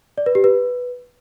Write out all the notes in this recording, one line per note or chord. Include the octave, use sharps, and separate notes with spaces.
D5
B4
G4
B4